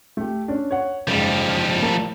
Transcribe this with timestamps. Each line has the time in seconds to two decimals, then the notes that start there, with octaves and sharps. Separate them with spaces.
0.17 A3 G4
0.48 C#4 D4
0.71 C#5 F#5
1.08 F#1 G#2 F3 G3
1.82 A2 A#4 A5